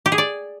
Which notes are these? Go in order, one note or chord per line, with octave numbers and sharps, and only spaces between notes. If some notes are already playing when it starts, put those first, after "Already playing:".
G4
G#4
D5